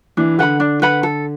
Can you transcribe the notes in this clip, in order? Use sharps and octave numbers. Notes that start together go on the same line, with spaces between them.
E3 D4
D3 B4 F#5 B5
D4
B4 F#5 B5
A4